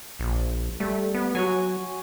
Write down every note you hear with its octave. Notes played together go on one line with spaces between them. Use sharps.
A#1
G3 A3
B3
F#3 F#4 C#5 G#5